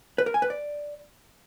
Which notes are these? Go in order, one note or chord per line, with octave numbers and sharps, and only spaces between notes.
B4
A#4
G#5
B4
D5